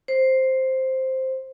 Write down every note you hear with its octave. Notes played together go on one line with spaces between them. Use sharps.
C5